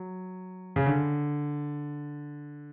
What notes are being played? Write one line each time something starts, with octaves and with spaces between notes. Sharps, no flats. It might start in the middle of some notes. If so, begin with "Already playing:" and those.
Already playing: F#3
C#3
D3